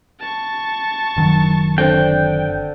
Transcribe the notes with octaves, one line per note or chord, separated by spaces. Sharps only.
A5 C#6
F#1 D#3 F#3
D3 C4 D4 G5